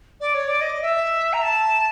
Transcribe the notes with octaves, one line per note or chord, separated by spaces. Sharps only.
D5
C#5
D5
D#5
E5
A#5
A5